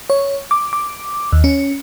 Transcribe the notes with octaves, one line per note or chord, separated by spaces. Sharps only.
C#5
D6
D6
D#2
C#4